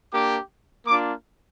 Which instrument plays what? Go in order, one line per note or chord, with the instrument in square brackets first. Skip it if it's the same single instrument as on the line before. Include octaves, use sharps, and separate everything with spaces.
[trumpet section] A#3 D4 G4 D6
A#3 D4 F4 D6